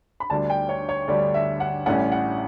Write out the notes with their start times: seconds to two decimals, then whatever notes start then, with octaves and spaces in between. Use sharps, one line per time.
0.20 B5
0.30 D2 D3 G3 D4 A5
0.50 G5
0.69 C#5
0.89 C#5
1.08 D2 D3 G3 D4 D5
1.34 E5
1.60 F#5
1.86 A1 A2 G3 C#4 F#5
2.12 F#5